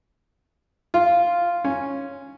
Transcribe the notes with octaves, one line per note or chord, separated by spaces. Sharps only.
F4
C#4